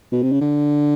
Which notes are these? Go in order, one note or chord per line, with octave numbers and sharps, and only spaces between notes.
B2
C3
C#3
D3